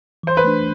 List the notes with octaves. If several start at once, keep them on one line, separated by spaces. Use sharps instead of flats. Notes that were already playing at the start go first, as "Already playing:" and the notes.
E3 C5
B4
A3 D4